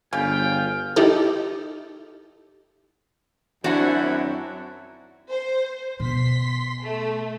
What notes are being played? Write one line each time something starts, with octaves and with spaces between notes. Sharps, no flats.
G1 C#3 F4 G5
D#4 E4 G4 A4
F#2 D#3 F#3 C4 D4 E4 F#4 F#5
C5
B2 C6 B6
A3